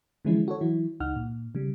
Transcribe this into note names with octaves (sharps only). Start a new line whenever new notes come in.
D3 E3 F3 G#3 C#4 E4
F#4 A4 C#5
E3 F#3 E4
C#2 D#4 F#5 F6
A#2
C#3 G3